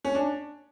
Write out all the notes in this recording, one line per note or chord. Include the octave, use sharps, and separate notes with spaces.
C#4
D4